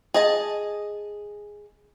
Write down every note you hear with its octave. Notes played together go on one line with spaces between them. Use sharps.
G#4 D#5 A5